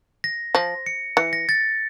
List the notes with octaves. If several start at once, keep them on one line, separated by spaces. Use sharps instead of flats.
A#6
F3 A#6
C#7
E3 C#7
A#6
A6